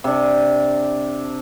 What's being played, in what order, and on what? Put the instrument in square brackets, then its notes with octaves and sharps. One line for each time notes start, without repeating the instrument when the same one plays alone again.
[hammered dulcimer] C3 D4